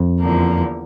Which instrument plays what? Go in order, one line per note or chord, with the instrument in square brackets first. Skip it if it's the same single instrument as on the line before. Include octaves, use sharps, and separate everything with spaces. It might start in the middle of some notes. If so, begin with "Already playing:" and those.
Already playing: [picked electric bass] F2
[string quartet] E2 D3 F3 A#3